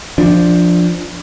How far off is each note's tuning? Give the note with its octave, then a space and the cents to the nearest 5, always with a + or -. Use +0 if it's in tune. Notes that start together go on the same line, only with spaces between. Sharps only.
F3 +0 D4 +0